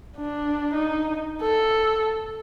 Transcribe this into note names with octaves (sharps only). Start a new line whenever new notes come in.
D4
D#4
A4